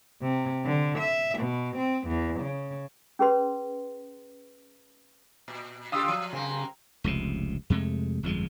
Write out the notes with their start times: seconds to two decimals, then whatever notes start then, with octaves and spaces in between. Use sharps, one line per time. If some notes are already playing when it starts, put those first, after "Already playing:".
0.22 C3
0.65 D3
0.99 E5
1.39 B2
1.76 C4
2.07 E2
2.40 C#3
3.19 C#4 G#4 B4 C6
5.48 A#2
5.92 C#3 F4 G4 F5 D#6 E6
6.08 F3
6.33 F#2 C#3 A#3 C4
7.04 F1 C#2 C3
7.70 F2 C3 G#3 A3
8.23 G1 F2 F3 G#3